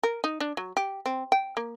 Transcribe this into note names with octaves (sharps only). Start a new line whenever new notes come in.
A#4
D#4
D4
F#3
G4
C4
G5
A#3